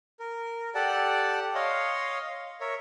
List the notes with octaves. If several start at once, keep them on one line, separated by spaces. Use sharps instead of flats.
A#4
G4 A4 D5 F#5 A5
C#5 D#5 F5 C6
A#4 C#5 E5